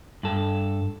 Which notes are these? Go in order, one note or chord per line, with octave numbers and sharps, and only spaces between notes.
G2 A4